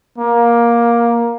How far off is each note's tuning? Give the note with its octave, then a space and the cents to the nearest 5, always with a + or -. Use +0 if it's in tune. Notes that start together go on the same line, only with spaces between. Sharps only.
A#3 +15